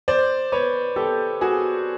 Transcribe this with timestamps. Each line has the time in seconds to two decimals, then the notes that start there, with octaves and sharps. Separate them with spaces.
0.08 C5 D5
0.52 B4 C#5
0.96 G4 A4
1.41 F#4 G#4